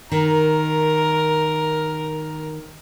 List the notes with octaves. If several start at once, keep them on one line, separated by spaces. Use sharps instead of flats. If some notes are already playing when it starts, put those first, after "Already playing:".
D#3 A#4